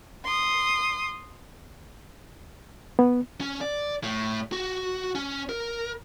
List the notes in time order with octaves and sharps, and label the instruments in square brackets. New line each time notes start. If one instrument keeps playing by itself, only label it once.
[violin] C6 D#6
[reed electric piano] B3
[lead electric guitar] C#4
D5
A2
F#4
C#4
A#4